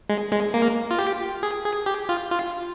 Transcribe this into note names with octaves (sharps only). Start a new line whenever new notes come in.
G#3
G#3
A#3
F4
G4
G#4
G#4
G4
F4
F4